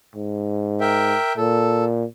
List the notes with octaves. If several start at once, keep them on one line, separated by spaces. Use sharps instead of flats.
G#2
A#4 E5 G5
A#2 A4